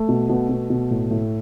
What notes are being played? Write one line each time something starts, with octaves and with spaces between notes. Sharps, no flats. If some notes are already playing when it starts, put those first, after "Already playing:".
Already playing: A3
B2
B2
B2
B2
A2
A2